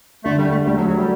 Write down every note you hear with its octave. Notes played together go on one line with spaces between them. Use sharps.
D3 A3
G3
D4
A3
G3 A3
F#3
F#3 F#4
G3